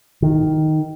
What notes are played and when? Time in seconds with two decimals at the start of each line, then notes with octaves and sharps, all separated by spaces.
0.22 D#3